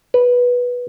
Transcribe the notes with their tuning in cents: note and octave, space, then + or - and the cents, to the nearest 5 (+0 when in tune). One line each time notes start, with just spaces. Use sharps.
B4 -10